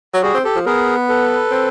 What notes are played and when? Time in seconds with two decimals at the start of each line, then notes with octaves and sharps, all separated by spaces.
0.14 F#3
0.23 G3 F#4 G#4
0.34 C4
0.44 G4 A4
0.55 F3
0.66 B3 G#4 A#4
1.09 A4 B4
1.51 C4